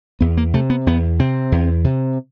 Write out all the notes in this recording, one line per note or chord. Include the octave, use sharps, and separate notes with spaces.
E2 B3
A#3
C3 A3
B3
E2 B3
C3 C4
E2
C3